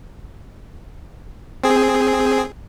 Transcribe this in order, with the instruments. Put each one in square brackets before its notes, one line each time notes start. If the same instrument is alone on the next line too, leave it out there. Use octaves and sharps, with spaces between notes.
[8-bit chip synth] C4 G#4